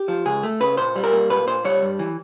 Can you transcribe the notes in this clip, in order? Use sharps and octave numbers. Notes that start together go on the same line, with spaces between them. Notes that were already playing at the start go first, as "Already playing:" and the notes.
Already playing: G4
F3
C#2 G#4
A3
C#3 B4
A#2 C5
G3
A#4
A#3
A#2 B4
A#2 C5
G3 C#5
G2
E3